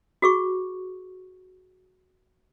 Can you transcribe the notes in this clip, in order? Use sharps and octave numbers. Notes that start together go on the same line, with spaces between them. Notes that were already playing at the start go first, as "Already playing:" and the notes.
F#4 G#4 C#6